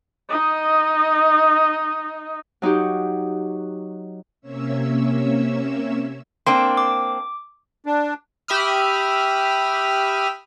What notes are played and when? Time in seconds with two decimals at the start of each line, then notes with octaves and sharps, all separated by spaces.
0.29 D#4 D#5
2.62 F#3 D#4 F#4 G4
4.41 C3 A#3 C#4 C#5 E5 E6
6.47 A#3 C4 D4 C6
6.77 D6
7.86 D4
8.48 G4 E5 B5 D#6 F6